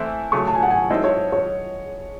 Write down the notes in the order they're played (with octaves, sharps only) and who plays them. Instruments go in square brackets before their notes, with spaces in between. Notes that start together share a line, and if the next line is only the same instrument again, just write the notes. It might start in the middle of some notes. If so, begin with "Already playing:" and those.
Already playing: [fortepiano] E3 A3 C4 E4
[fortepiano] C#3 F#3 A3 [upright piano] C#6
[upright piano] A5
G#5
F#5
G#5
[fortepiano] G#2 F#3 C4 E4 A4 [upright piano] D#5
[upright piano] C#5
C#5